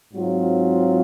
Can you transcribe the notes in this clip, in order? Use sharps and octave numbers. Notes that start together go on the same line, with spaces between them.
G#2 F#3 C4 F4